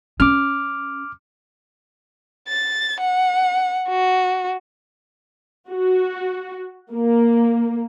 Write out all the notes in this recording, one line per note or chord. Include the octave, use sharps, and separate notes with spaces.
C#4 D6 F6
A6
F#5
F#4
F#4
A#3